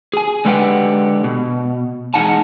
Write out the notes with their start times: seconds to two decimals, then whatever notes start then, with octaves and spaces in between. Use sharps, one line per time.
0.13 G#4 G#5
0.45 D3 G#3 G4 B4 F#5 G5
1.24 B2
2.14 E2 G#3 D#4 F#5 G#5 A5